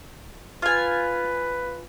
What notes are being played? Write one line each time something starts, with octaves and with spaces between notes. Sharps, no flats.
F4 B4 G#5